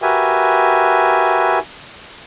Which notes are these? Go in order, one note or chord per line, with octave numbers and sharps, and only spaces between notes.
F#4 G4 A#4 B4 E5 G#5